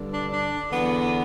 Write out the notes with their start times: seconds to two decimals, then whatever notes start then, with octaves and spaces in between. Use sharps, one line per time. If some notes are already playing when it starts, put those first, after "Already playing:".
Already playing: G2 D3
0.11 D4
0.31 D4
0.70 E2 D3 B3